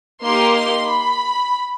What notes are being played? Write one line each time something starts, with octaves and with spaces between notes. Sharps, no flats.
A#3 D#4 G4 C6
C6
B5